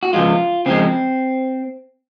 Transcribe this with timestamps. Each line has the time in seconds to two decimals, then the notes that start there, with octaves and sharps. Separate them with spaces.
0.03 F#4
0.13 C#3 F3 G#3 F4
0.66 C#3 F3 G#3 C4